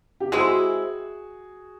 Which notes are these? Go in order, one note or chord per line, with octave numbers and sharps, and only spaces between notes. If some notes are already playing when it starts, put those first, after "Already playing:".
G4
G#3 C4 E4 F#4 G#4